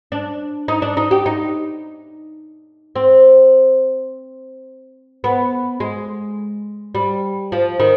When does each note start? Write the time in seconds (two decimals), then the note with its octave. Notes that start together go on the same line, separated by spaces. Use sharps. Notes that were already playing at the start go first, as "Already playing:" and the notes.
0.12 D4
0.68 D#4
0.82 D4
0.97 D#4
1.11 G4
1.26 D#4
2.96 C4
5.24 B3
5.80 G#3
6.95 G3
7.52 F3
7.80 D#3